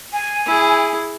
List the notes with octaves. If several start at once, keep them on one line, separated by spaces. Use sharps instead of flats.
G#5
E4 G#4